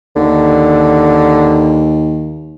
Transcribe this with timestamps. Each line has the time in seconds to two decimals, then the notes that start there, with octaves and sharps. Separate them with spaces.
0.16 D#2 D3